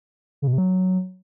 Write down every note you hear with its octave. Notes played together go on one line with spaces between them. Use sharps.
C#3
B2
C3
F#3